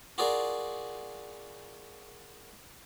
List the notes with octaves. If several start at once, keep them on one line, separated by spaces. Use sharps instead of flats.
F4 F#4 G#4 A#4 D5